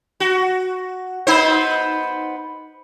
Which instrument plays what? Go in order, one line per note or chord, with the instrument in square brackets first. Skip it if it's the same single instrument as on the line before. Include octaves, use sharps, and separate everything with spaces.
[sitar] F#4
B3 D#4 C5